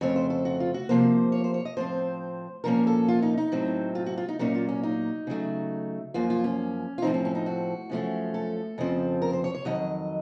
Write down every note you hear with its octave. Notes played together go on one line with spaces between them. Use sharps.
F2 C#3 A3 C4 C#5
C5
A4
F#4
F4
F#4
C3 F3 A#3 C5
C#5
C5
C#5
D#5
A2 F3 C4 C5
A#2 F3 A#3 C#4 A#4
A4
F4
D#4
D#4
A2 F#3 C4
F4
F#4
F4
D#4
A#2 F#3 A#3 C#4 D#4
F4
C#4
D#4
C#3 F#3 A3
F#2 F3 A#3 F4
F4
C#4
F4
A2 F3 C4 D#4
C#4
C#4
D#4
F#4
F#2 F3 A3 C#4
A4
F2 C#3 F3 C4
A#4
C5
C#5
C#5
F2 D#3 F#3 D#5